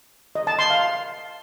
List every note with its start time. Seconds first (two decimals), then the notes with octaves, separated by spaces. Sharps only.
0.35 D#5
0.47 A5
0.59 C6
0.70 F5